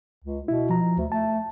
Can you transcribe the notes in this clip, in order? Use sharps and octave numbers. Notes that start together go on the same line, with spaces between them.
C#2
B2 E4
F3 A#5
D2
A3 A5